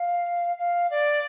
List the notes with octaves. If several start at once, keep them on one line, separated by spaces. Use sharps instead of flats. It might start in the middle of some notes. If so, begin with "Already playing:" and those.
Already playing: F5
F5
D5